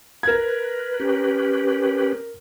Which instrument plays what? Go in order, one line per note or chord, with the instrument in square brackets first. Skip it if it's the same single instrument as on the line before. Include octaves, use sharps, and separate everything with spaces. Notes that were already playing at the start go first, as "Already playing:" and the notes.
[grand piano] A#4 G#6 [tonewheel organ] B4
[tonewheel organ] C#4 G4 B4